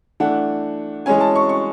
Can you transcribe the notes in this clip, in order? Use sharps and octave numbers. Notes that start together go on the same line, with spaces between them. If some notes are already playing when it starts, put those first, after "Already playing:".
E3 A3 D4 F#5
E3 G#3 C#4 G#5
A5
C#6
C#6